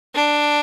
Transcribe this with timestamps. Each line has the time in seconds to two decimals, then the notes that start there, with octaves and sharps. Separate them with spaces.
0.15 D4